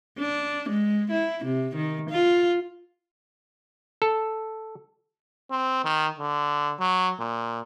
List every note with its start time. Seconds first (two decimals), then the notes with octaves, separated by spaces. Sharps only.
0.19 D4
0.69 G#3
1.11 E4
1.45 C3
1.75 D#3
2.10 F4
4.02 A4
5.51 C4
5.85 D#3
6.19 D3
6.80 F#3
7.20 A#2